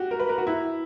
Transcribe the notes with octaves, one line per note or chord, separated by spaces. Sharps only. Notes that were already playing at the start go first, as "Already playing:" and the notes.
Already playing: F#4 G4
A#4
B4
A#4
F#4
E4